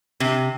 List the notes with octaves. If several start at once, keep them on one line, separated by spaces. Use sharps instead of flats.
C3